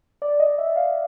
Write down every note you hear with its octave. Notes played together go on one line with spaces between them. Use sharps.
D5
D#5
E5
F5